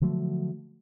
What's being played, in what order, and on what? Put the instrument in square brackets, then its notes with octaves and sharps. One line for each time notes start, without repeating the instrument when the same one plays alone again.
[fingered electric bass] D3 F3 F#3 A3